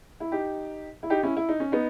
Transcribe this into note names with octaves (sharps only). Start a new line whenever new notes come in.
E4
D#4 G4
E4
D#4 G4
C#4 E4
E4
D#4
C#4
B3 D#4